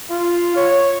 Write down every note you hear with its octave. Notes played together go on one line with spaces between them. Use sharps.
F4
C#5